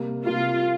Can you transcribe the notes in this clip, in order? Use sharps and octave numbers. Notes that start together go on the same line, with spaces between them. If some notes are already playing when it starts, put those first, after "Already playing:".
Already playing: C3 G3 A#3
C3 G3 A#3 F4